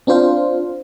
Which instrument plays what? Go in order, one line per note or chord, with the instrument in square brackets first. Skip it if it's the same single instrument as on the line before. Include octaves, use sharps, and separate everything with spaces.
[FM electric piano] C4 D4 F4 C5 F5